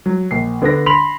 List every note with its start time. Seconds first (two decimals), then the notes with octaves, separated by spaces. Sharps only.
0.06 F#3
0.31 A#1 C7
0.62 D3 B3 D4 A#6
0.86 B5 C6 B6 F7 F#7